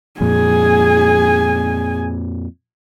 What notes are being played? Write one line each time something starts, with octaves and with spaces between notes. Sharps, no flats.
F2 A#2 G#4 G#5